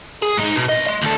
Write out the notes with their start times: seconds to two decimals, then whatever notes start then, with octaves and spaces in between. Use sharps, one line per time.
0.22 G#4
0.37 G#2 D#4
0.56 B2
0.69 C2 D#5
0.86 D#5 C6
1.02 D2 A4